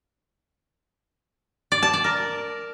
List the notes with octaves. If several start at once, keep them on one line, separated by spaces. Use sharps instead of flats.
D5
A5
D5
A#4